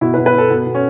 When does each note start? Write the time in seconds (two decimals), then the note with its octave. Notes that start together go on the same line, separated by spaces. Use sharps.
0.01 B2 E4
0.14 B4
0.18 B2
0.26 B4
0.34 B2 A4
0.50 B2 B3
0.66 B2
0.75 C#4